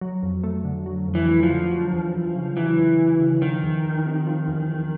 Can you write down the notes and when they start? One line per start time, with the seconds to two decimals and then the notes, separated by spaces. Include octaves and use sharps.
0.01 F#3
0.23 F2
0.44 A3
0.65 D3
0.86 F#3
1.08 F2
1.15 E3
1.29 A3
1.43 F3
1.50 D3
1.71 F#3
1.93 E2
2.14 E2
2.36 C#3
2.57 E3 F#3
2.78 E2
2.99 E2
3.20 C#3
3.42 D#3 F3
3.63 E2
3.84 E2
4.06 C3
4.27 F3
4.48 E2
4.69 E2